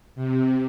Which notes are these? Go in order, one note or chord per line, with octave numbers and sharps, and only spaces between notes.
C3